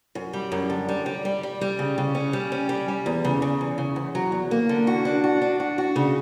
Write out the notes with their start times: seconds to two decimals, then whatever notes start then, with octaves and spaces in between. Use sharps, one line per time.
0.15 F#2
0.33 G3
0.52 F#2
0.70 D3
0.89 G3
1.06 G3
1.25 G3
1.43 G3
1.61 G3
1.79 C#3
1.98 C#3
2.15 C#4
2.33 G3
2.52 C#4
2.69 G3
2.88 G3
3.06 E2
3.25 C#3
3.42 C#3
3.61 E2
3.78 C#3
3.96 E2
4.15 F#3
4.32 E2
4.51 A#3
4.69 D3
4.87 F#4
5.05 D4
5.24 F#4
5.42 D4
5.60 F#4
5.78 F#4
5.96 C#3